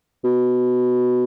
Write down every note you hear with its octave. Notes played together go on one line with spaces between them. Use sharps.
B2